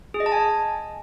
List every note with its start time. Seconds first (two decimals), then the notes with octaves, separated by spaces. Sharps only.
0.14 G#4
0.20 D#5
0.26 A5
0.32 G#5